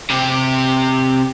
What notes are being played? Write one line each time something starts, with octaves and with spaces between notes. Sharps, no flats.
C3 G4